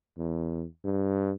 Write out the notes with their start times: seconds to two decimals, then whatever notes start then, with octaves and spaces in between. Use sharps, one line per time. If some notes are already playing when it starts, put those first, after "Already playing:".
0.18 E2
0.84 G2